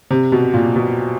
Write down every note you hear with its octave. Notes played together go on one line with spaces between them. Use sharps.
C3
B2
A#2
B2